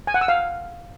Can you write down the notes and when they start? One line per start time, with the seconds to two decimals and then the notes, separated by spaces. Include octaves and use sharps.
0.07 G#5
0.14 F#5
0.21 E6
0.28 F5